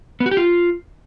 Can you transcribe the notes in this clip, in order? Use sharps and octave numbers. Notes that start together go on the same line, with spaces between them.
B3
F#4
G4
F4